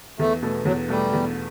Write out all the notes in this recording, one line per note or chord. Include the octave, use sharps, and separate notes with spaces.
E2 A3
B2 A3
E2 F#3
B2 G3 A3
E2